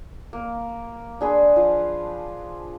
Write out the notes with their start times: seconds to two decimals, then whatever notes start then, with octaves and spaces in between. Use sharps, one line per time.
0.33 A#3
1.21 D4 G#4 B4 C5
1.56 F3